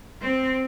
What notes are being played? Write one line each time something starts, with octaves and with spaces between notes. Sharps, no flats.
C4